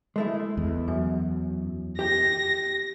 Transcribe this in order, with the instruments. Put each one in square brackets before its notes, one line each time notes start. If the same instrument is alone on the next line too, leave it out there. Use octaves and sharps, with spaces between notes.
[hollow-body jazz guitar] G#3 A3 E4
[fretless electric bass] E2
[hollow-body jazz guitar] F#2
[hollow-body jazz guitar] G4 G5 [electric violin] A#6